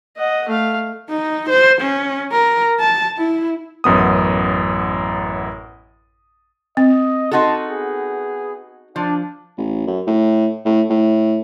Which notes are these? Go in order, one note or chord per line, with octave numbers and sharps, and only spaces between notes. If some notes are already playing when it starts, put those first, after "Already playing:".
D#5 F#5
A3 F5
D#4
C5
C#4
A#4
A5
E4
A1 F#2 B3 D#6
C4 D#5
D#4 F#4 A4 A5 C6
B3 G#4
F3 D4
A1
F#2
A2
A2
A2